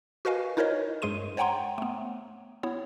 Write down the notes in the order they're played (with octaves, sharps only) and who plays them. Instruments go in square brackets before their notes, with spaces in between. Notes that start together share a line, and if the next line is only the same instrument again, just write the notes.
[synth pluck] F#4 A#4 B4 D#5 F5 G#5
D#4 E4 A#4 C5 C#5 D#5
G2 G#3 G#4 C6 D#7
C5 C#5 F#5 G5 A#5 C6
A3 B3
B3 E4 C#5